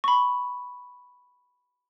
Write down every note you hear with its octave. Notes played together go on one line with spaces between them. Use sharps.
B5 C#6